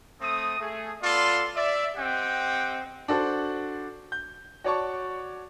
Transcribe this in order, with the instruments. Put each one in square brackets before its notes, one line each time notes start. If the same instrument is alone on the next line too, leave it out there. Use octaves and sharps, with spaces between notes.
[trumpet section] A3 C4 D#6
A3 G#4
B3 F4 A4 D5 C6
D5 E5
C4 G4 D#5 F#5 G5
[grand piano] D4 F#4 A4 C5
G6
F#4 C#5 D5 A5 C#6